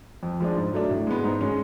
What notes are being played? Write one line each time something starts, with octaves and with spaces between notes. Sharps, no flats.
F2
F3 G#3 D4
G#2
F#3 A3 D4
A2
G#3 B3
G#2
G#3 C#4